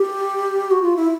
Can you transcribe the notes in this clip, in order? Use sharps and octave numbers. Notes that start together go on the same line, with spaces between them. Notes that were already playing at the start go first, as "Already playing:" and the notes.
Already playing: G4
F#4
F4
E4